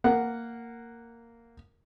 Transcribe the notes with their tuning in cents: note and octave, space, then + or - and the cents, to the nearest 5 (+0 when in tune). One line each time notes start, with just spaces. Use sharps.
A#3 -10 F#5 +0